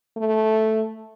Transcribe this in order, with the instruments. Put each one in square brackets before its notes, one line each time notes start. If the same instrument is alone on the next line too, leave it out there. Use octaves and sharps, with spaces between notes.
[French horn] A3